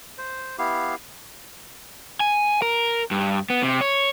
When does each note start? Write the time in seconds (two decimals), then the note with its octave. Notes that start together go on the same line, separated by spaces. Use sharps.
0.18 C5
0.58 B3 E4 G4 F5
2.20 G#5
2.62 A#4
3.11 G2
3.50 B3
3.63 C3
3.81 C#5